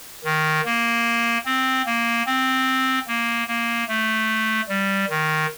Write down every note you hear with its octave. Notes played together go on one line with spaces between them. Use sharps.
D#3
A#3
C4
A#3
C4
A#3
A#3
A3
G3
D#3